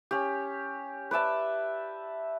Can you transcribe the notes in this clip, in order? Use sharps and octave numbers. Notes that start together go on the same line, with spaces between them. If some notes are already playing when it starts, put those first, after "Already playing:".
C#4 G4
B4 D5 E5 A5